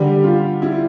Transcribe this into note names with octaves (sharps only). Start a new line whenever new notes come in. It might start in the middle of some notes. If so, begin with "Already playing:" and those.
Already playing: D3 G3 G4
F4
E4